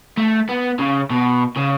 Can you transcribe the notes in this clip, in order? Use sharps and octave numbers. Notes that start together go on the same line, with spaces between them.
A3
B3
C#3
B2
C#3